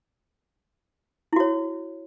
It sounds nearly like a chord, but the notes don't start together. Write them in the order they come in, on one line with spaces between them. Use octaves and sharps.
E4 F#4 C#5